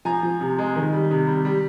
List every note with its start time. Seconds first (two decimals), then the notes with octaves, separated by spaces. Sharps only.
0.05 F3 G#5 A#5
0.23 F3
0.40 C3
0.58 G#3
0.76 D#3
0.93 G3
1.11 C3
1.27 G3
1.45 G3